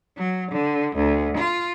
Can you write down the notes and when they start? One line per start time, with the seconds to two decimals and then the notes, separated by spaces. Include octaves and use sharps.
0.17 F#3
0.51 D3
0.96 D2
1.37 F4